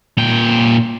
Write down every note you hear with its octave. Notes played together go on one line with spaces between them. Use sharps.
A#2 G5